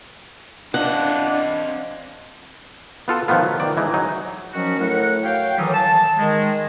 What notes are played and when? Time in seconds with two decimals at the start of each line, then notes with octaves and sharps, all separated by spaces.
0.74 C4 D4 D#5 F5 F#5
3.08 B3 F4 A4
3.28 D#3 F3 A3 B3 F4
3.43 F#3
3.60 D#3 D5
3.77 E3 G#3 D#4
3.94 F#3 D#4
4.54 D#3 F3 F#3 C#4 F#4
4.80 A2 A3 E4 A#4 F#5
5.24 F#4 C#5 F5 G5
5.58 A2 D#3 E3 F#3 G3 D#6
5.74 A5
6.19 D#3 G#3